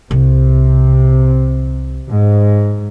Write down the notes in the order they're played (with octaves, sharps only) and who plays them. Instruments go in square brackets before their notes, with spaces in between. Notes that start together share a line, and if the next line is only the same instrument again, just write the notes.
[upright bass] C2 [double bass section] C3
[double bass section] G#2